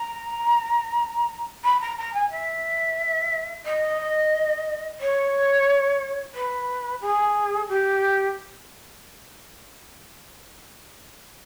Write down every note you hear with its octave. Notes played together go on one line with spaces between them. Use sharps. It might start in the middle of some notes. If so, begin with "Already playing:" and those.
Already playing: A#5
B5
A#5
A#5
G#5
E5
D#5
C#5
B4
G#4
G4